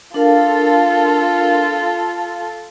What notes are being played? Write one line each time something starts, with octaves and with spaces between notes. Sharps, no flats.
D4 F4 A4 A#4 F5